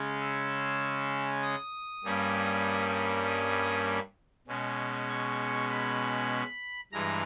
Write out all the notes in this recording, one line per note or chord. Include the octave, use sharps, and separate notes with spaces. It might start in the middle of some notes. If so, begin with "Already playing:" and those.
Already playing: C#3 G#3 C#4
E6
D#6
G2 G3 A#3 C#4
D#6
B2 G#3 C#4
C#6
B5
G2 E3 G#3 A#5